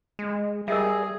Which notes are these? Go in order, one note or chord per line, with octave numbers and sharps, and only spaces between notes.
G#3
G3 G#4 A#4 D#5 E5